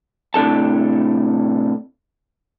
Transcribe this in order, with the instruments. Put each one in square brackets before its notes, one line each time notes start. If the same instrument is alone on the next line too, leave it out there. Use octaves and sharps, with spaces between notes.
[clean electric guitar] A2 C3 D4 A4 A5